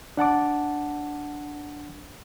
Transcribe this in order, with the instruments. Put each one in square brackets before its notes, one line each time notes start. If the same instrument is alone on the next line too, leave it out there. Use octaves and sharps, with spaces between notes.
[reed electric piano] D4 F#5 A5 D6